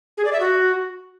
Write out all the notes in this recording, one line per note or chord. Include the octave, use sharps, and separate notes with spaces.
G#4
D5
E5
F#4